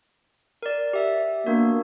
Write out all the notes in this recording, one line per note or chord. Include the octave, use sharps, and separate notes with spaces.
A#4 D5
G4 E5
A#3 B3 D4 F#4